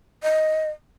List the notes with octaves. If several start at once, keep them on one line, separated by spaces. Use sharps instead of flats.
D#5